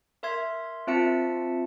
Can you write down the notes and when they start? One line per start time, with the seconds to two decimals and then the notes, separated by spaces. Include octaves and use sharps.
0.23 A#4 E5 C6 G#6
0.87 C4 F4 E5 A5 C#7